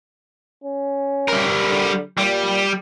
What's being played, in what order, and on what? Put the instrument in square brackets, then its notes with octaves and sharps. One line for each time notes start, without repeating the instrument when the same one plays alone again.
[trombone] C#4
[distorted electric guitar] G3 A#4
[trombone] D3
[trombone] A#2 [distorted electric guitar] G3